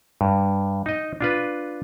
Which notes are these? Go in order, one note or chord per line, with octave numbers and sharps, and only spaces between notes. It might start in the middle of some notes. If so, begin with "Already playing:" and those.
G2
D#4 D#5
D4 F4 B4